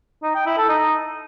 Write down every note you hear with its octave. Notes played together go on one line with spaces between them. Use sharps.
D#4
G5
E4
A4
D#4